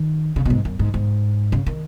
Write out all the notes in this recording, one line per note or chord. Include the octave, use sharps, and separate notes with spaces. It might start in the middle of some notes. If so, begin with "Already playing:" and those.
Already playing: D#3
C#3
B2
G#2
F#2
G#2
G#2
C#3
D#3